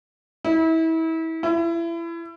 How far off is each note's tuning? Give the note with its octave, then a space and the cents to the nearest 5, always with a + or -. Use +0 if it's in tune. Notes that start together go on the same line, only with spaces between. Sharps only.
E4 -30
E4 +30